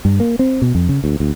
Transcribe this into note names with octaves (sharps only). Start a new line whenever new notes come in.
G2
A#3
C4
B2
F2
C#3
D2
D2